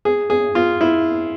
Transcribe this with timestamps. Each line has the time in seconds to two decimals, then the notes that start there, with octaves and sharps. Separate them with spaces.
0.05 G#4
0.30 G#4
0.55 F4
0.81 E4